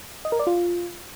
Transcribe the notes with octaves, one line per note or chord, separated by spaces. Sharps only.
D#5
A#4
D5
F4